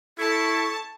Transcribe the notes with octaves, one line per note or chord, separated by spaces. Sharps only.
E4 A4 A5 C#6